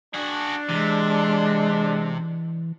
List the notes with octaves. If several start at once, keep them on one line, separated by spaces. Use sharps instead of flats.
D4 F#4 G#4
C3 E3 G#3